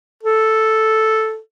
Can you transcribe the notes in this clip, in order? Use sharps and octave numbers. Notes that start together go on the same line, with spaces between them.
A4